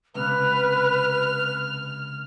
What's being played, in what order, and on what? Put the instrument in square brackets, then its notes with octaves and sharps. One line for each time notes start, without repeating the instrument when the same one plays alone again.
[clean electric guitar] C#2 C3 [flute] B4 [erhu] F6